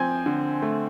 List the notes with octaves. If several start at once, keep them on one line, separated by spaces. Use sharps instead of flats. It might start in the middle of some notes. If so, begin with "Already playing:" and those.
Already playing: F3 C4 G5 G#5 G6 G#6
D3
A3